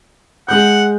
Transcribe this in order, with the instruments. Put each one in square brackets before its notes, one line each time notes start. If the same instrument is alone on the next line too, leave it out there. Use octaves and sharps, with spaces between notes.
[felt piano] G#3 G6 [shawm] F#5